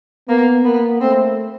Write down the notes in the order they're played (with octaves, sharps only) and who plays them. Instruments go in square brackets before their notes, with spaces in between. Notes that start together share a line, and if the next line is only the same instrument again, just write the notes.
[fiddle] A#3 [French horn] B3
[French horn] A#3 [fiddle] B3
[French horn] A3 [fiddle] C4